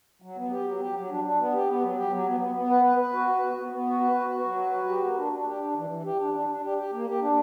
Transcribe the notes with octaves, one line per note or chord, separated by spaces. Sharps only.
F#3
B3
G4
F#3
G4
F#3
D4
D4
B3
G4
B3
F#3
G4
F#3
B3
B3
B3
B4
B4
B4
F#4
B4
B3
B3
B3
F#4
B4
F#4
F#4
F#3
B4
F#4
G4
A#3
D4
D4
G4
D4
E3
E3
G4
D4
D4
D4
G4
G4
A#3
G4
D4